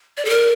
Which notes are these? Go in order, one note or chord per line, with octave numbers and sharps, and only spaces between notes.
D5
A4
A#4